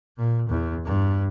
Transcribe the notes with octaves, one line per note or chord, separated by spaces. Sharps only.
A#2
E2
G2